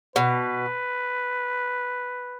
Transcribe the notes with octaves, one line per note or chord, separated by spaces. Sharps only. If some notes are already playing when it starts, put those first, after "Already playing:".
B2 B4